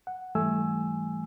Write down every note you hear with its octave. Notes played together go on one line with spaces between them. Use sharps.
F#5
G#2 E3 G3 A3 G#5 E6